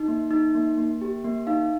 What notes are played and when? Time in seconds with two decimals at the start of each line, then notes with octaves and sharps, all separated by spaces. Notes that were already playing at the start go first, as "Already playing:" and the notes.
Already playing: D#4
0.08 A#3
0.31 D#4
0.55 A#3
0.77 A#3
1.01 G4
1.24 A#3
1.47 D#4 F5